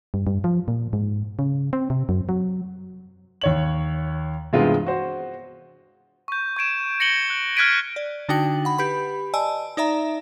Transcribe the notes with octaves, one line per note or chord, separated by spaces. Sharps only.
G2
G2
F3
A#2
G#2
C#3
C4
C3
F#2
F#3
D#2 C#5 F#7
G2 C3 E3 G#3 B3 F4
F#4 C5
C#6 G6
C#6 G#6 D7 E7
A#6 C#7 D7 F#7 G7
F#6
F6 F#6 G#6 B6 D7 D#7
D5
D3 D4 D#4 F#4 G5 F#7
F#5 B5
G4 B4 B5
D5 D#5 G#5 A5 E6
D#4 D5 E5 A#5